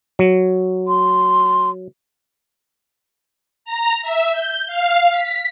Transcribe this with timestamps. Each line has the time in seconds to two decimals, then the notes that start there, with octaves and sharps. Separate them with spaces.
0.19 F#3
0.88 C6
3.65 A#5
4.03 E5
4.32 G6
4.67 F5
5.11 B6